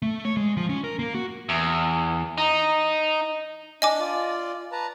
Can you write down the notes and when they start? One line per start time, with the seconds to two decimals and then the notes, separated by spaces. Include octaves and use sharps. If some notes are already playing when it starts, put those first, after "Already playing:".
0.02 A3
0.25 C#5
0.37 G#3
0.57 F3
0.69 C#4
0.84 A#4
0.99 A#3
1.14 F#4
1.49 E2
2.38 D#4
3.82 D4 D#5 G#5 D6
4.00 F4 D5
4.72 B4 A5 A#5